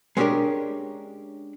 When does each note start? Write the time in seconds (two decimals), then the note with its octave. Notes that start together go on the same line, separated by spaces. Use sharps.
0.17 G#3 B3 C#4 D4 G4 A#4